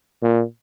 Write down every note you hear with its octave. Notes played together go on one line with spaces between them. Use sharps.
A#2